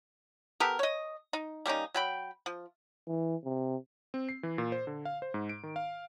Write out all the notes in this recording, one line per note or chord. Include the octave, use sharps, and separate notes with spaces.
B3 G4 A4 A#4
C#5 D#5
D#4
G3 A#3 C#4 D#4
F#3 G5 B5
F3
E3
C3
C4
C7
E3
A#2
C5
D3
F5
C5
G#2
D7
D#3
F5